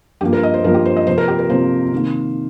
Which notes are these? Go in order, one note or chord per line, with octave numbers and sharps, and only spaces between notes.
G2 F3 A#3 G4
A#4
D#5
C5
G2 F3 A#3 A#4
G4
C5
D#5
F2 C3 F3 A#3 C5
A#4
G4
A#4
F2 C3 F3 A#3 C5
C3 D#3 A#3